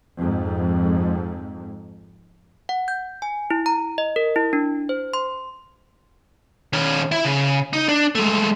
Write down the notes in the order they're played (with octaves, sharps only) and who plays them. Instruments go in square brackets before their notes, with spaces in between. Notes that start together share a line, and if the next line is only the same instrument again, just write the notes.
[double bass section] F2 G#2
[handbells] F#5
G6
G#5
E4
A#5
D#5
A#4
E4
D4
C5
C6
[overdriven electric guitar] D#3 C#4
E4 E5
C#3
D#4
D4
G#3 A3